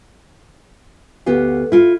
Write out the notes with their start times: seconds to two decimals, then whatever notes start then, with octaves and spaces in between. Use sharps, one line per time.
1.26 D2 B3 G4 F5
1.72 E4 F4